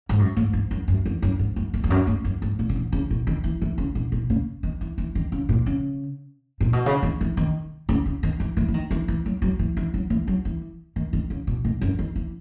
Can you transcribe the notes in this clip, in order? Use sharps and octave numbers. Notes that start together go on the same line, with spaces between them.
G#2
F#2
G#2
G#2
F#2
F#2
E2
F#2
G#2
F#2
E2
E2
F#2
G#2
F#2
G#2
A#2
C#3
B2
C#3
B2
D#3
E3
E3
C#3
B2
B2
C#3
D#3
E3
E3
D#3
C#3
A#2
C#3
A#2
B2
C#3
D#3
E3
D#3
C#3
C#3
D#3
E3
E3
E3
D#3
E3
E3
F#3
F#3
E3
E3
F#3
E3
F#3
E3
D#3
D#3
C#3
B2
B2
F#2
D#3
E3